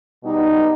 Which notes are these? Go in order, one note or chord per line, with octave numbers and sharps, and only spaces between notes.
B2 G3 B3 D#4